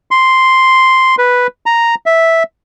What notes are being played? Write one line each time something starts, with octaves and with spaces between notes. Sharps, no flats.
C6
B4
A#5
E5